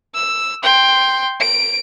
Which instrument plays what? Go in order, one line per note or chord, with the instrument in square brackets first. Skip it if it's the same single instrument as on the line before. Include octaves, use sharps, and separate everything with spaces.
[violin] E6
G5 C6
D7